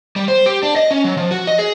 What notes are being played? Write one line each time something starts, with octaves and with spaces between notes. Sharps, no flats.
G3
C5
G4
D4
D#5
C#4
F#3
F3
F#4
D#5
G#4